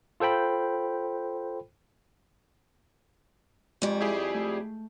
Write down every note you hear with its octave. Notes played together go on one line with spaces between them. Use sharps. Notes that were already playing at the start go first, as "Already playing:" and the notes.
F4 A4 C5 G5 B5
F2 G3 G#3 C#6
E4 G4 G#4 G6
A3